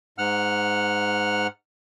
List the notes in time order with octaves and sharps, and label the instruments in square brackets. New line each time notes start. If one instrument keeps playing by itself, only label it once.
[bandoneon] G#2 F#5 F6